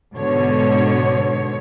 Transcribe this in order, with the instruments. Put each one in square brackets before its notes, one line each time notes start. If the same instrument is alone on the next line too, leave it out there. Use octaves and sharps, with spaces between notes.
[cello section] G#2 B2 D3 C#5